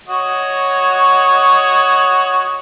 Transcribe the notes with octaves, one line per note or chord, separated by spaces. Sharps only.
F#4 C#5 D#5